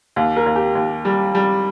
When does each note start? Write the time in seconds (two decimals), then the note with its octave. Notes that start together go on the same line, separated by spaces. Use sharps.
0.16 D#2
0.36 A#4
0.46 D#2
0.56 G4
0.75 D#2
1.05 G3
1.35 G3